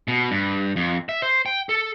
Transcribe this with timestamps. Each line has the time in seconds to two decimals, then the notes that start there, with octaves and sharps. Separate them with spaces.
0.08 B2
0.31 G2
0.76 F2
1.09 E5
1.22 C5
1.46 G5
1.69 A4